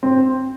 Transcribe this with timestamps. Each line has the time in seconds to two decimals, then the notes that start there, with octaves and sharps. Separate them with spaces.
0.03 C4